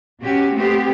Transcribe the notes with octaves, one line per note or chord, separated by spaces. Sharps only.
B2 C#4 F#4 G4
A3 B3 C4 G4